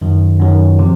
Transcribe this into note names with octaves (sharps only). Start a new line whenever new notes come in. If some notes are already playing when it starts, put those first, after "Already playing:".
F#2 D#3 F#3
F#2 D#3 F#3
C3 F3